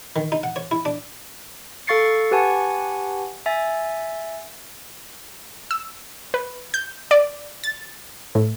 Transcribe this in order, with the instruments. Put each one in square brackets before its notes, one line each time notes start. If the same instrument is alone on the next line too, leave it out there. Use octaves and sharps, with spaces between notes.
[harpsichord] D#3
D#4
F#5
C#5
E4
D4
[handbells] A4 F5 C#6 A6 C7 C#7
G4 B4 F#5 G#5 A5 C#6
E5 G#5 A6
[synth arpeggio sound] E6
B4
G6
D5
A6
A2